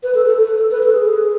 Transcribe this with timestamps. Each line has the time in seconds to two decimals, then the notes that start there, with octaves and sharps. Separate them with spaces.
0.03 B4
0.15 A4
0.26 A4
0.38 A4
0.71 B4
0.83 A4
0.94 G#4
1.06 G#4